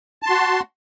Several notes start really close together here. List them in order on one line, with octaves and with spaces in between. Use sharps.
A5 C6 F#4